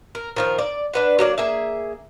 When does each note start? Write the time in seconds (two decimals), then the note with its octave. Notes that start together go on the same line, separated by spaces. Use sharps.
0.15 A#4
0.36 D#3 F3 A#4
0.58 D5
0.94 D4 B4 F#5
1.19 F#3 A#3 D5
1.38 A#3 G#4 E5